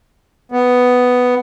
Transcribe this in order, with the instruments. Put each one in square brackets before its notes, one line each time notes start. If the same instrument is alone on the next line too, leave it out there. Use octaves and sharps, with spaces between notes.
[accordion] B3